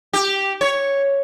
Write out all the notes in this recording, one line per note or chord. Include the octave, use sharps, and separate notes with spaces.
G4
C#5